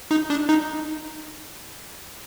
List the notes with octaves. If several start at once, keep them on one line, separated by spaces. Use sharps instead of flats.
D#4
D4
D#4